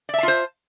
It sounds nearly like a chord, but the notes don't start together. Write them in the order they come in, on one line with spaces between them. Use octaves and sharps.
D5 E5 A5 F4 C5